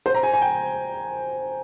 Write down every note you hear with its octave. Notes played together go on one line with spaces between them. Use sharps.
C5
A#5
G#5
G#5
G5